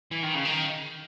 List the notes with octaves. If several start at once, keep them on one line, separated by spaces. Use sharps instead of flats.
E3
D#3
C#3
D#3